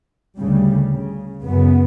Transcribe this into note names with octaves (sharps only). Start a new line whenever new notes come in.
D2 C#3 G3
C#3
F#2 C#3 B3